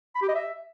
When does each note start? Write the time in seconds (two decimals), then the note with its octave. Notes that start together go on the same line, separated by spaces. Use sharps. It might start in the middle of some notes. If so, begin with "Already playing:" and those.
0.15 B5
0.22 G4
0.29 D#5
0.35 E5